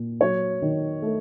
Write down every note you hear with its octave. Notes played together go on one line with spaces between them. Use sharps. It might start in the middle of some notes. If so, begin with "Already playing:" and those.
Already playing: A#2
F#3 C#5
D#3
A3